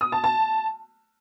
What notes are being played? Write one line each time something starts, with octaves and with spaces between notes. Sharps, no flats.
D#6
A5
A5